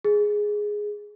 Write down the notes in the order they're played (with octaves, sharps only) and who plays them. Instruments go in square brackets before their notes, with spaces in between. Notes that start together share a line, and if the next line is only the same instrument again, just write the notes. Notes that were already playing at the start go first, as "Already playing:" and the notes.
[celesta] G#4